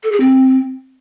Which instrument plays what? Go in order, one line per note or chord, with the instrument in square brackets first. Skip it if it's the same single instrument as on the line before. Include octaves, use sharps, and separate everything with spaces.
[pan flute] A4
G#4
C4